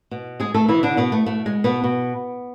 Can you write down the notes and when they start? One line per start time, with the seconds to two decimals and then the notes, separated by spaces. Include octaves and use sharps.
0.11 B2
0.40 G#3 G#4
0.54 A3 A4
0.68 B2 E3 E4
0.83 D3 D4
0.97 B2 B3
1.12 A3
1.26 B2 A3
1.46 G#3
1.64 B2 B3
1.84 B2